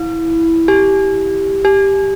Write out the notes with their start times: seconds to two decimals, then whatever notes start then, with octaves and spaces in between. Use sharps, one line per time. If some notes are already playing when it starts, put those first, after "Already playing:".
Already playing: E4
0.68 G4
1.65 G4